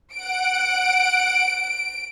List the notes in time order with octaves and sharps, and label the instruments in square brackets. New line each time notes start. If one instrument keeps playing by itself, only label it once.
[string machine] F#5 [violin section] D7